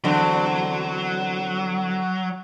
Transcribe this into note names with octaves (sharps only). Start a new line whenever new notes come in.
E2 D3 F#3 C4